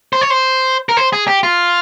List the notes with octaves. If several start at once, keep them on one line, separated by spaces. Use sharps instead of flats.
C5
C#5
C5
A#4
C5
G#4
G4
F4